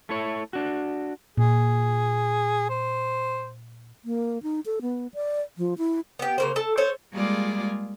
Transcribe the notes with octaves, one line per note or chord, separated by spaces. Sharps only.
A3 E4 C#5
D4 F#4
A#2 G#4
C5
A#3
D#4
A4
B3
D5
F3
E4
B3 G4
C#3 A#3 C5
A4 A5
A4 C5 C#5
G3 G#3 A#3 F4 G#4 D5